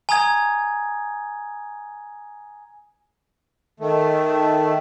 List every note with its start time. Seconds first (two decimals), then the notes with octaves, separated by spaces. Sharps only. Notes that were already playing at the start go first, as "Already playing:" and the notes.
0.09 G#5 A#5 D#6 G#6
3.80 D#3 A3